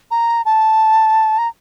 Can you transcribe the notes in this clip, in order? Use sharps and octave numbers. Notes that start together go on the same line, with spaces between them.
A#5
A5
A#5